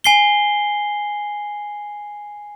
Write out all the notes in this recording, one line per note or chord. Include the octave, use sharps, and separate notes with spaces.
G#5 C7 G7